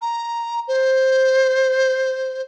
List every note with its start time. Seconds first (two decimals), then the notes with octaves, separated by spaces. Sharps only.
0.02 A#5
0.68 C5